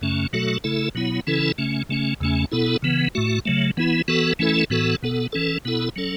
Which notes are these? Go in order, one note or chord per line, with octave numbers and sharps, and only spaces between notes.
F#2 C#3 A3 C#4
B2 F#3 A3 F#4 A4
C#3 A3 E4 A4
B2 F#3 B3 E4
C#3 E3 C#4 E4 A4
C#3 A3 C#4
C#3 A3 C#4
E2 C#3 A3 C#4
B2 B3 E4 A4
C#3 E3 B3
A2 A3 F#4
C#3 F#3 A3
E3 B3 E4
E3 B3 F#4 A4
E3 A3 C#4 E4 A4
A2 E3 B3 F#4 A4
B2 B3 A4
E3 C#4 A4
B2 B3 E4 A4
F#3 C#4 A4